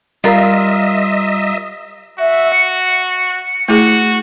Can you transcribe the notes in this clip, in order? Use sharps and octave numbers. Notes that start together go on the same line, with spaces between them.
G3 F4 A#4 D#5 E5
F#4 E5
C#7
A3 E4 F#4 G#4